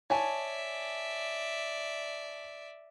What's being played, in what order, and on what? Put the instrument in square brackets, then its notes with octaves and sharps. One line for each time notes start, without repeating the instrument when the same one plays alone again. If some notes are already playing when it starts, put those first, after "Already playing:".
[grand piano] C#5 G#5 A5 [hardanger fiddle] D5 E5